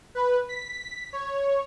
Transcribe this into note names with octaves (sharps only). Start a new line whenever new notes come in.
B4
B6
C#5